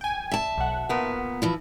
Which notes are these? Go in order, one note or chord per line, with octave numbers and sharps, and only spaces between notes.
G5 G#5
E5 A5
B1 F#5
A#2 B3 A#4
E3 F3 E4